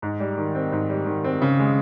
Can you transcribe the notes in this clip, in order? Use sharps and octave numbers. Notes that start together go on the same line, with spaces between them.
G#2
G3
D#3
C4
G#2
G3
D#3
C4
C#3
G#3